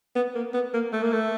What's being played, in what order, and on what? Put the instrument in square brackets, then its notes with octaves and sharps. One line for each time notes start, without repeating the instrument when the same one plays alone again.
[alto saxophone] B3
A#3
B3
A#3
A3
A#3
A3